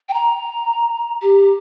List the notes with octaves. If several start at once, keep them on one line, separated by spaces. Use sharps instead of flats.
G5
A#5
G4